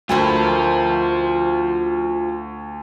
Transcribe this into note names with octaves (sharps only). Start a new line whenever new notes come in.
D2 A3 E4 F4 A#4 C5